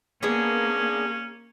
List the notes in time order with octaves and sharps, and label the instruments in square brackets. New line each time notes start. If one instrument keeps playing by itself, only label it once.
[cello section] A#3 [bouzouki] B3 D4 G#4 [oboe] C#4